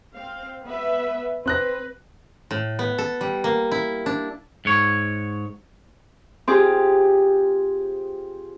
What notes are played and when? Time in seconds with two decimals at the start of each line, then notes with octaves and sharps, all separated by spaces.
0.16 C4 F5
0.65 B3 B4 E5
1.46 C4 B4 F#6 A#6
2.51 A2
2.79 B3
2.98 A4
3.21 G3
3.44 A#3
3.71 E4
4.06 D4
4.65 G#2 C#5
6.47 C4 F4 G4 G#4